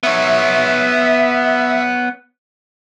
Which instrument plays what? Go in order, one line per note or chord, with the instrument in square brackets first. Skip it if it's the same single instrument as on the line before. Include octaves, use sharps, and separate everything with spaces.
[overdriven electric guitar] B3 C#5 [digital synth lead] E5